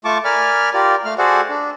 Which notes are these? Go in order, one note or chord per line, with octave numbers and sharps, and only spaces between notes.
A3 F4 A5 C#6 D6
A#4 D5 G#5 B5 F6
F4 G4 A#4 D5
A3 F5 F6
F#4 G#4 A4 C5 D5 F#5
D4